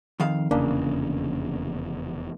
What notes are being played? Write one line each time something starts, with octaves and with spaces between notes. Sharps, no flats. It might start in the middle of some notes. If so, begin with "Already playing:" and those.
F2 D#3 F5
F1 E2 C#3 A#3 D4